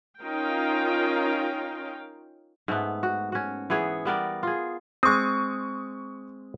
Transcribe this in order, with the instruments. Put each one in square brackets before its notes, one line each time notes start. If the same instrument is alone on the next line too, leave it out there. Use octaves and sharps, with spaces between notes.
[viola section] C#4 D#4 F4 A#4 F5 G5
[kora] G#2 A3 B3
F#4
C#4 F#4
E3 B3 G#4 C#5
G3 B3 A#4 D5
F4 G#4
[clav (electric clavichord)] G#3 C4 [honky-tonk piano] C#6 D#6